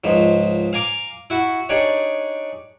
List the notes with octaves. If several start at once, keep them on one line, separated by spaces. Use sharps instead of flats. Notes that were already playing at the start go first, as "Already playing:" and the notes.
C#2 G#2 F3
F5 G#5 A#5 D6
E4 F#4
D4 D#4 G4 G#4 C#5 D5